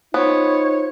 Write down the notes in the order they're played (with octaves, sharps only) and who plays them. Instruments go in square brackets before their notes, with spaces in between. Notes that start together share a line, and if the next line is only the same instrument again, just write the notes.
[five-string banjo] B3 [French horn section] D#4 [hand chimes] F4 C5 [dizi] C#5